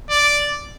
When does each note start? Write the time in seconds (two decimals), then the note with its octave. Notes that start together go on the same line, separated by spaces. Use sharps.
0.10 D5